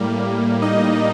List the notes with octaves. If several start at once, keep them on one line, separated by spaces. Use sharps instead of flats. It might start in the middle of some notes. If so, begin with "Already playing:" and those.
Already playing: A2 G3 A#3
D#4 D#5